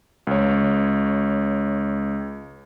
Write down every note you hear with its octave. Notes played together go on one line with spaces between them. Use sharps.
C#2 C#5